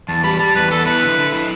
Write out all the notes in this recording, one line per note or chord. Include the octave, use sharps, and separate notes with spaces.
E2 A5
G3 B5
G3 A5
E2 B4
B3 A4
E4 B4
D3
D3
E4